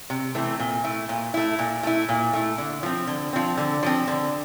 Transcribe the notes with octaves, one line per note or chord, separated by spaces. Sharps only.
C3
E3 A3 C4
A#2
A3 E4
A#2
A3 E4
A#2
A3 E4
A#2
A3 E4
D3
F3 C4
D3
F3 C4
D3
F3 C4
D3